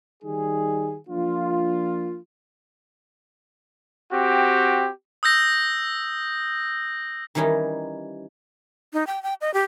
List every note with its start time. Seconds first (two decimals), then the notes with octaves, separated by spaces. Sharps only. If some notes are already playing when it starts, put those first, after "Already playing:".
0.23 D#3 G3 D#4 G#4
1.08 F3 A#3 D4 F4
4.12 C4 F#4 G4
5.23 D#6 E6 G6 A#6
7.35 D#3 E3 G3 C#4 D#4
8.93 D#4
9.07 G5
9.23 G5
9.41 D#5
9.54 G4